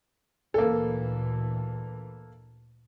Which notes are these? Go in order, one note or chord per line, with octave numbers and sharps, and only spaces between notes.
D2 A#2 E3 A#3 A4